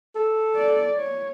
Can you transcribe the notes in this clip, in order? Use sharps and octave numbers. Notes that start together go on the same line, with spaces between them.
A4
D5
C#5